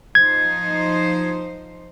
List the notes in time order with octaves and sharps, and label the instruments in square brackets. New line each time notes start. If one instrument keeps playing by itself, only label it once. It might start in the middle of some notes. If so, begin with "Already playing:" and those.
[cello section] F3 D#4 C5 [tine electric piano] G#6